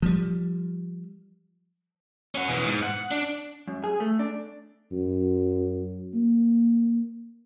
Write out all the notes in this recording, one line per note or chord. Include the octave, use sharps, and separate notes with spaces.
F3 G3
C#4 F#5
B2 E3
G#2
F#5
D4
F#2
G#4
A3
D4
F#2
A#3